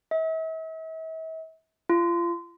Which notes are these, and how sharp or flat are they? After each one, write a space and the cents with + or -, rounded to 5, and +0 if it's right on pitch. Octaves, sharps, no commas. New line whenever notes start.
E5 -40
F4 -30